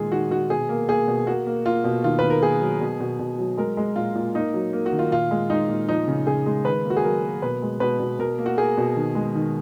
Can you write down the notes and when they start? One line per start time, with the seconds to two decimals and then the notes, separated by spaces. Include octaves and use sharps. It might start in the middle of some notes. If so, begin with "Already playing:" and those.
Already playing: A#2 D#3 G#3 G#4
0.11 D#3 F#4
0.31 D#3 F#4
0.50 B2 G#4
0.69 A#3
0.88 A#3 G#4
1.08 B2
1.27 A#3 F#4
1.46 A#3
1.65 A#3 F4
1.84 B2
2.04 D#3 F4
2.19 D#3 B4
2.30 A#4
2.42 A#3 G#4
2.61 F#3
2.81 B2
3.00 B2
3.19 B2
3.39 F#3
3.57 G#3 A#4
3.77 G#3
3.96 A#2 F4
4.15 A#2
4.35 A#3 D#4
4.54 F#3
4.73 A#3
4.86 F#4
4.92 D#3
4.99 F4
5.12 A#2 F4
5.31 G#3
5.50 G#3 D#4
5.69 A#2
5.89 F3 D#4
6.08 C#3
6.27 C#3 G#4
6.46 G#3
6.65 D#3 B4
6.85 A#3
6.90 F#4
6.97 G#4
7.04 F#3 A#4
7.23 A#3
7.42 B2 B4
7.62 G#3
7.80 B2 B4
8.00 B2
8.19 B2 A#4
8.39 A#3
8.46 F#4
8.58 A#3 G#4
8.78 B2
8.96 D#3
9.15 G#3
9.35 D#3